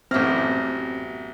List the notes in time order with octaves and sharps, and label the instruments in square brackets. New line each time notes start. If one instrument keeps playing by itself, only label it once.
[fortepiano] A1 F6 [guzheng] F#2 G4 [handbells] B3 E5 A#6 [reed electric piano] C4